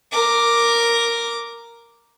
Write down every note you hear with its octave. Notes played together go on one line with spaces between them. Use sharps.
A#4 D6